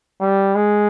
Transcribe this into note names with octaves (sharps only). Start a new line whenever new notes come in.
G3
G#3